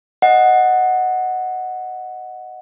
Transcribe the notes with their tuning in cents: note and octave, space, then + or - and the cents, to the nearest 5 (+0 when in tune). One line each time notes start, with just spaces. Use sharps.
D#5 +0 F#5 +0